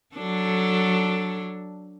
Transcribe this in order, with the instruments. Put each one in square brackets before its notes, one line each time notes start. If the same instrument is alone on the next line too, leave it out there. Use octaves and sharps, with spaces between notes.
[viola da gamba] F#3 D4 A4